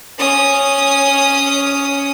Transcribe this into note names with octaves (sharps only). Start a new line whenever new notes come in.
C#4 D#6